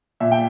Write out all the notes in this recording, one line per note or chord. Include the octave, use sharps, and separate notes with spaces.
A#2 E5
G5